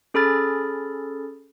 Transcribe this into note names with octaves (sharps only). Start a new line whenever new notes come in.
C#4 G#4 A4 B5 F6 A6